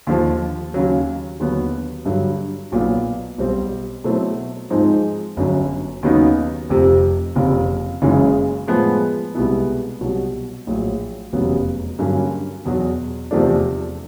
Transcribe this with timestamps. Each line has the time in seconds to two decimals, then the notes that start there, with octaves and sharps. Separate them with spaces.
0.07 D#2 D3 F3
0.74 D#2 C#3 F#3
1.40 D#2 D3 F#3 B3
2.06 G2 D3 F#3
2.72 B1 A#2 F#3 B3
3.38 B1 B2 G3 C4
4.04 B2 F#3 A3 C4 E4
4.70 G#2 F3 G#3 C4 D#4
5.37 G1 F#2 D3 F#3
6.03 D#2 C#3 F#3 B3 D#4
6.69 F1 F2 C3
7.36 F#1 F2 C3
8.02 F#1 F#2 C#3 E3 G#3
8.67 A2 F3 G#3 B3
9.35 C2 B2 G#3 B3 E4
10.01 C2 B2 F#3
10.67 A#1 A2 F#3
11.33 F1 E2 C#3 F#3 B3
11.99 G2 D3 F#3 A#3 C#4
12.65 E2 B2 F#3
13.31 E2 C3 F3 A3 D4